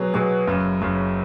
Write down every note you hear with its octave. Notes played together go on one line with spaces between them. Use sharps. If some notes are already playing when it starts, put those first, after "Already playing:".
Already playing: B2 F#3 B3 G#4
B2 F#3 B3 G#4
F#1 F#2 C#3
F#1 F#2 C#3